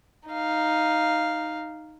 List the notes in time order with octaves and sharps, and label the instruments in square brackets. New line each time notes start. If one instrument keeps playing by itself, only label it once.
[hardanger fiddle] D#4 F5